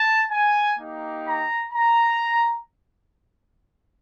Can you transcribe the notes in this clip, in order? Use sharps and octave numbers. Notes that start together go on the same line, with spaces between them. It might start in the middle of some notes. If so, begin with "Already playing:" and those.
Already playing: A5
G#5
A#3 D#4 G4
A#5
A#5